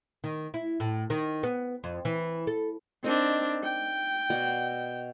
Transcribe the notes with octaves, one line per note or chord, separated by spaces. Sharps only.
D#3
E4
A2
D#3
B3
F2
E3
A4
C4 D4 D#4 A#4 D#5
G5
B2 D5 F#5